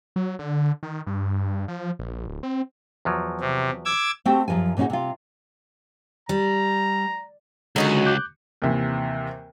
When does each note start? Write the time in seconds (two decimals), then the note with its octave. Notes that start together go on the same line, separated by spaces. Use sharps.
0.16 F#3
0.39 D3
0.83 D#3
1.07 G2
1.68 F3
1.99 A#1
2.27 D1
2.43 C4
3.05 E2 F3 F#3
3.40 C3
3.85 D6 E6 G#6
4.25 A3 C4 F#4 G4 G5 A5
4.48 F#2 F3 A#4 G#5
4.77 A#2 C#3 C#4 D#4 F#4
4.90 C3 F4
6.29 G3 A#5
7.76 C#2 D3 F#3 G#3 D#4 F#4
8.06 D6 F#6 G6
8.62 D#2 C3 E3